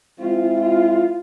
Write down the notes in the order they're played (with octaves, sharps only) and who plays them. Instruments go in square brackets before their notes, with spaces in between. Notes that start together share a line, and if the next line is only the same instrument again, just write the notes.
[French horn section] G#3 C4 E4 [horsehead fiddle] F4
[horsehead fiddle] F4